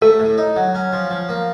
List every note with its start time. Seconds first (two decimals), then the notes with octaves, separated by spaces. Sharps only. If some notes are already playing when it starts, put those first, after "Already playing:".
0.02 A3 A4
0.19 A2
0.37 D#4
0.56 F#3
0.75 C#4
0.93 F3
1.10 F3
1.29 A#3